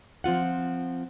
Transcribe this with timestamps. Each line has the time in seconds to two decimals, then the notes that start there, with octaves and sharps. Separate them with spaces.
0.24 F3 C4 F4 F#5